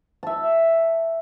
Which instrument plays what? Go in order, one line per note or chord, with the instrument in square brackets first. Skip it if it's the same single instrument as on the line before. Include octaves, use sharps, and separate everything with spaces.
[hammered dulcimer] E5 A5